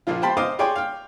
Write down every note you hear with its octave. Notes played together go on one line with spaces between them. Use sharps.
A#1 A#2 F3 F4
G4 C5 G5 A5 B5 C6
C5 D#5 F5 C6 D6
G4 G#4 C#5 D5 G5 C6
F5 G5